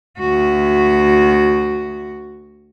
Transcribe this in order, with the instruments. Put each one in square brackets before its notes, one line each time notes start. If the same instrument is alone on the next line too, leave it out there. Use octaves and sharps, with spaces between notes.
[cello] D2 F#4